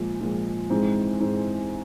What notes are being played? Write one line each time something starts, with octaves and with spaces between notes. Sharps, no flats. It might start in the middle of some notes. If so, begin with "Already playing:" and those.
Already playing: A#2 F3 G#3
A#2 F3 G#3
G#2 E3 G#3 C4
G#2 E3 G#3 C4